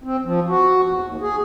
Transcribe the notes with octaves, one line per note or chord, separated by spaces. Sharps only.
C4
F3
F#4
E2
D#2
G#4